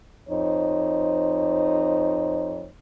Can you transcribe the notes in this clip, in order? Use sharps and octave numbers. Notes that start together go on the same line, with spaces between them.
F2 D#4 C5 C#5